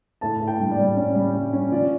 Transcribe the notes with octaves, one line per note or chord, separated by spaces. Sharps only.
A2 A5
A2
G5
G3
D5
G3
C#4 C#5
G3
G3
C#4
F3 D5